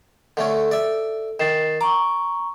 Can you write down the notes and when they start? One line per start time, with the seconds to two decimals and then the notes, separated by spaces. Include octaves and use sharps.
0.37 D3 A3 C#4
0.71 A4 D5 E5
1.40 D#3 A6 C7 E7
1.81 A#5 C#6 D6